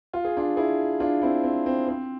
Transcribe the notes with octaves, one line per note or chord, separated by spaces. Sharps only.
F4
G#4
D4 F4
E4 G#4
D4 F4
C4 E4
C4
C4
C4